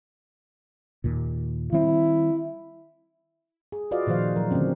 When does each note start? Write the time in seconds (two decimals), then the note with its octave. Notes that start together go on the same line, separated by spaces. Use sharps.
1.04 D#2 A#2
1.72 D#3 G3 C4 E4
3.72 G#4
3.91 F4 F#4 B4 D5 D#5 F5
4.07 A#2 D#3 F3 C5 F5
4.36 F#3 A#4
4.51 D3 E3 A3 C4 C#4